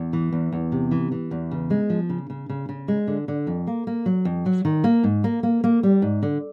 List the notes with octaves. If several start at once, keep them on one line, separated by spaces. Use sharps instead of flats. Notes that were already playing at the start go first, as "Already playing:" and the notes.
Already playing: E2
E3
E2
E2
C3
E3
E3
E2
C#3
G#3
F3
C#3
C#3
C#3
C#3
G#3
D3
D3
F2
A#3
A#3
F#3
F2
F#3
D#3
A#3
G#2
A#3
A#3
A#3
G3
G#2
D3